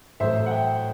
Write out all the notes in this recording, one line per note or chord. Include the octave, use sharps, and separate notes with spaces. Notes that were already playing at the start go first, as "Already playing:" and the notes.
A1 A2 F#3 A3 C5 E5
F#5
E5 G5